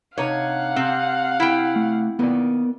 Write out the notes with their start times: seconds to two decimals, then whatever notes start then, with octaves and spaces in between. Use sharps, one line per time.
0.18 C3 D4 D#4 C#5 F5 F#5
0.76 C3 C4
1.40 E4 G5
1.76 A3
2.19 D#3 A#3 B3 A#4 D5